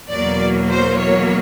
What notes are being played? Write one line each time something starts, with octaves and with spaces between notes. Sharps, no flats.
E2 B2 F#3 A#3 D5
C5
C#5